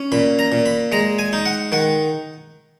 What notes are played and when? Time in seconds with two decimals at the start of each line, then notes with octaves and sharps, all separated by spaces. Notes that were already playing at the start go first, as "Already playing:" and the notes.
Already playing: C#4
0.12 A#2 B5
0.39 A#5
0.52 A#2
0.66 B5
0.92 G#3 A#5
1.19 G#5
1.33 D#4
1.46 F#5
1.72 D#3 F#5